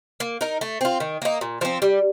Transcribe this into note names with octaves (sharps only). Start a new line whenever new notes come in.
A#3
D#4 A#4
A3
C4 F4
D#3
A#3 D#4
A#2
F3 C4
G3